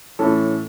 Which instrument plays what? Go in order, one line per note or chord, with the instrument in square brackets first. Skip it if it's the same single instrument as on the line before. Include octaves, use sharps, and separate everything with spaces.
[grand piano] A2 E3 A3 C#4 A4